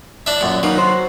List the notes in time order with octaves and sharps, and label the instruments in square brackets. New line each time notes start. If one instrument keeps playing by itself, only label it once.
[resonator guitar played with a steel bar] A2 [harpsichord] D4 E5
[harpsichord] F#2 A#2
[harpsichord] F#3 [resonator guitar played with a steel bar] A#3 D#4 B4
[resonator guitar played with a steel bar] C3 F#4 C5